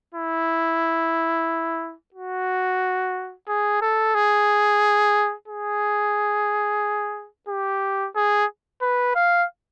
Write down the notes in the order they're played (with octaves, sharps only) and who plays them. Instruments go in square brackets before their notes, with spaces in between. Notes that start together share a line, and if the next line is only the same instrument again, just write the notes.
[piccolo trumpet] E4
F#4
G#4
A4
G#4
G#4
G4
G#4
B4
F5